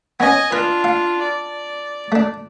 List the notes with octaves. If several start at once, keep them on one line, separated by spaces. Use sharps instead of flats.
B3 C#4 D#5 G#5
D4 F4 B4
F5
D5
A3 D4